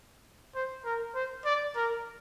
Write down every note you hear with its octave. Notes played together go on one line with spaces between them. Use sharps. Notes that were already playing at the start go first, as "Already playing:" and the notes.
C5
A#4
C5
D5
A#4